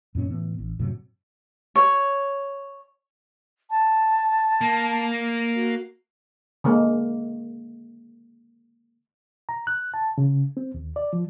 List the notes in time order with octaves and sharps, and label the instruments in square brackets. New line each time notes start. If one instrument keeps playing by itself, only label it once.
[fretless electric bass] F#2 A#2 B3 C#4
A2 E3 B3
A1
F#2 A2 C3 F#3
[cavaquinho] C#5
[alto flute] A5
[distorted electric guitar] A#3
[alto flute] F#4
[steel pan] D3 G#3 A#3
[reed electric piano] A#5
F#6
A5
C#3
C4
D#2
D5
F3